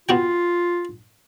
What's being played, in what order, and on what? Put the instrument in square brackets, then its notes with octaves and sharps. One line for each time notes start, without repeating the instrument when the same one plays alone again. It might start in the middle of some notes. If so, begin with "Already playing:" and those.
[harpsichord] B3 F#4 G5 [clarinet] F4